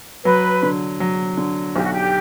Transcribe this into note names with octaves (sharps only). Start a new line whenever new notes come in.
F#3 B4
D3
F#3
D3
B1 G4
F#4
G4